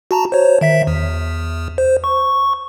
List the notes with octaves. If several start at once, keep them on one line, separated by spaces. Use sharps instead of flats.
F#4 A5 A#5
C5 C#5
D#3 E5 B6
E2
C5
C#6